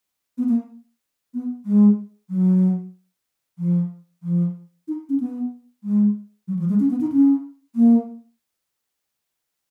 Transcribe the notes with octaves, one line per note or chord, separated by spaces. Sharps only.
B3
A#3
B3
G#3
F#3
F3
F3
D#4
C#4
B3
G#3
F#3
F3
G#3
C#4
B3
D#4
C#4
A#3